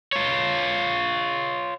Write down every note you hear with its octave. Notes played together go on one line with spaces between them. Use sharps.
F4 C#5